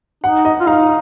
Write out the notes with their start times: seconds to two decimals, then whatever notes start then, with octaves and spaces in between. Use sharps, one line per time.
0.24 D#4 F#5
0.45 D#5
0.60 F4
0.67 D#4 F5